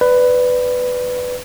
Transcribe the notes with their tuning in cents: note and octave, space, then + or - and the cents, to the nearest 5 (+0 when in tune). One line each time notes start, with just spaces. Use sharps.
B4 +10 D5 +0